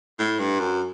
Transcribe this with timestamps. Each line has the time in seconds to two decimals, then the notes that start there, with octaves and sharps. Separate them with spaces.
0.19 A2
0.39 G2
0.60 F#2